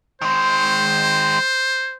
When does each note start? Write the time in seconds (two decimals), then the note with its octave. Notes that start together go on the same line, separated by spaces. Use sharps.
0.22 D#3 G#3 C5